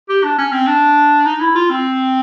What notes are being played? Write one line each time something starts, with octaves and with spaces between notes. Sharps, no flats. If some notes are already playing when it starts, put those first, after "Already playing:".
G4
D4
C#4
C4
D4
D#4
E4
F4
C4